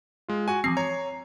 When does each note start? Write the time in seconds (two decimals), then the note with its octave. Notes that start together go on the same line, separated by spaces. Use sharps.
0.28 G#3 F4
0.48 F#4 G#5
0.64 E3 F3 C4 C7
0.77 C#5 A#5